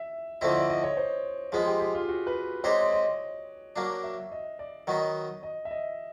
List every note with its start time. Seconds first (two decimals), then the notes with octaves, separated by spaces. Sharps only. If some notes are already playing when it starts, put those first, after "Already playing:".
Already playing: E5
0.41 D3 F3 A3 C4 E4 D#5
0.56 D5
0.70 D#5
0.84 C#5
0.97 C5
1.52 F3 G#3 B3 G#4
1.67 G4
1.80 G4
1.95 F4
2.09 F#4
2.27 B4
2.64 G#3 C4 D#4 G4 C5 C#5
2.82 D5
2.92 D#5
3.76 F#3 A#3 D4 F5
4.04 E5
4.32 D#5
4.59 D5
4.87 D#3 F#3 B3 D#4 D#5
5.43 D#5
5.65 E5
5.71 D#5